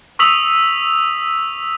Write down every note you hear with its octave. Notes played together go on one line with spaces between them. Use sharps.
C#6 D#6 E6 B6 F7 F#7